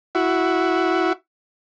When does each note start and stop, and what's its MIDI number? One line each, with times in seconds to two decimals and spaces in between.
0.15 1.13 64
0.15 1.13 66